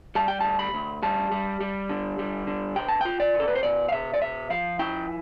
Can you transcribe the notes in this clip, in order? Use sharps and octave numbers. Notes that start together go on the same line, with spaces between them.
G3 A5
G5
D2 A5
B5
D2
G3 A5
G3
G3
D3
G3
D3
B2 G5
A5
F4 G5
D5
B2
A4
B4
C5
B2 D5
F5
B2 E5
D5
B2 E5
F3 F5
E4 G5